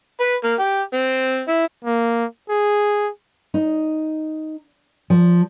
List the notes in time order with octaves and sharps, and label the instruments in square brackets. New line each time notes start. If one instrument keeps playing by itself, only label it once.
[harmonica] B4
A#3
G4
C4
E4
[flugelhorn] A#3
G#4
[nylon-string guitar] D#4
F3